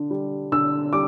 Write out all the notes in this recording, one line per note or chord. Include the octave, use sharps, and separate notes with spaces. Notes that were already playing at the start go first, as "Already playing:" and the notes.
Already playing: D3
G3
D3 E6
G3 D6